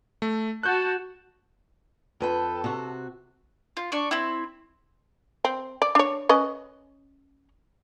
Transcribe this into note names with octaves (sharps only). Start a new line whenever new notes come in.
A3
F#4 A5 F#6 G6
F2 A4 B4 G5
C3 F#4
F4
D4 D5 C#6
C4 E4
C4
D5
D4 C#5
C#4 B4 D#5